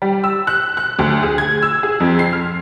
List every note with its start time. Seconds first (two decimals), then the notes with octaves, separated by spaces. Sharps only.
0.02 G3
0.24 E6
0.47 F#6
0.77 F#6
0.99 D2
1.23 G#4
1.38 G#6
1.62 E6
1.83 G#4
2.00 F2
2.19 C7
2.33 F6